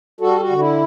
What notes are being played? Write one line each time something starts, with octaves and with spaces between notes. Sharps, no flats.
G3 F#4 A4
F#4
D3
E4